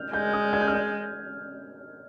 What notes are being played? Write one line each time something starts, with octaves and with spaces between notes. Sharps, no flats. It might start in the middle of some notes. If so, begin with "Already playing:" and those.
Already playing: F6 G6
G#3 G6
D#6
G#6
G6
F6
G6